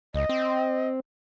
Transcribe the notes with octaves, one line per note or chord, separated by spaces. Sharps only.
C#2 D#5
C4